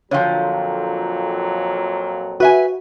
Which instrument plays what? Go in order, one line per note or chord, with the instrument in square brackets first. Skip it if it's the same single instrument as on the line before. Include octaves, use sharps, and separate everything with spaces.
[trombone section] F2 A#2 F#3 [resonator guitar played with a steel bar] D3 F3 [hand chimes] C#5 F5 G5
[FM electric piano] F#4 [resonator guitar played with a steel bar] B4 E5 G#5